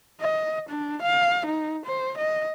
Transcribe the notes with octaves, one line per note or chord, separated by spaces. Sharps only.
D#5
D4
F5
D#4
C5
D#5